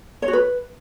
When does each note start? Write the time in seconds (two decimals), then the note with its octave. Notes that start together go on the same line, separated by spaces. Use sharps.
0.22 C#5
0.28 F#4
0.33 B4